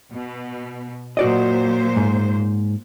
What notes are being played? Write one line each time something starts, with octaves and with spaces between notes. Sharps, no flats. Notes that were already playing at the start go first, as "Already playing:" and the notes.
B2
A#2 F#3 F#4 C5 D5 D#5
G#2